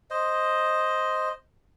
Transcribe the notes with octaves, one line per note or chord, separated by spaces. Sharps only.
C5 D#5